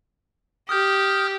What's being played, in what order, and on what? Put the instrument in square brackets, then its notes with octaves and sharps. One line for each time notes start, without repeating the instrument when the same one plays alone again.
[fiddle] G4 [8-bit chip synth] D#6 F6 G6